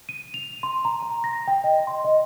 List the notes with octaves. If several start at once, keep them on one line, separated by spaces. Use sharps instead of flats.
D#7
F7
C6
A#5
A#5
A#6
G5
D#5
C6
D#5